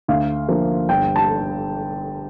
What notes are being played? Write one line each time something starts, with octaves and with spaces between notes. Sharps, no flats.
D2 F5
D3 F3 A#3
G1 G5
A5